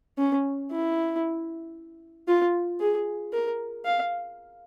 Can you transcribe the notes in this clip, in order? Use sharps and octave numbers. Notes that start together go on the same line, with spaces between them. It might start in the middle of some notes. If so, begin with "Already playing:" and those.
C#4
E4
F4
G#4
A#4
F5